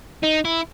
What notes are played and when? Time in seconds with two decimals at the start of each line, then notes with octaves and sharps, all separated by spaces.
0.23 D#4
0.45 E4